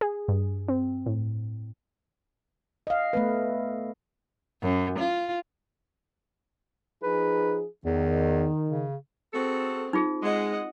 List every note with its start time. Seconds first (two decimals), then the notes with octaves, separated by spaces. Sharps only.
0.01 G#4
0.28 G2
0.68 C4
1.06 A2
2.87 D#5 F5
3.13 A3 B3 B4
4.62 F#2
4.99 F4
7.03 F3 D#4 G#4 B4
7.85 E2 D#3
8.69 C#3
9.34 C4 F#4 G#4 A4
9.93 D#4 F4 G#4
10.22 G#3 D#5 F#5